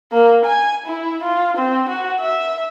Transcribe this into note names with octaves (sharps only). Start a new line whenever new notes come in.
A#3
G#5
E4
F4
C4
F#4
E5